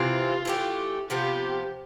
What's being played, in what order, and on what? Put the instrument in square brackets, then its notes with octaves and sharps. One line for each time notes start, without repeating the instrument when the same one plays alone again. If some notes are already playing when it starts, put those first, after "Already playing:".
Already playing: [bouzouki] C3 E3 C4 [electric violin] F4
[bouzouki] E3 A3 D4 G4
[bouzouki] C3 F3 B3 [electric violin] G4